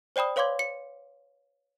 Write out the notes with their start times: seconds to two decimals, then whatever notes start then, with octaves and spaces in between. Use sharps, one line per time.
0.16 C5 D5 G5 B5 D#6
0.36 B4 C#5 F5 C6 D6 G#6
0.59 C#7